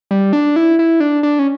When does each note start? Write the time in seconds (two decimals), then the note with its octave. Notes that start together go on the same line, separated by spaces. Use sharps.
0.11 G3
0.33 D4
0.56 E4
0.79 E4
1.00 D4
1.23 D4
1.39 C#4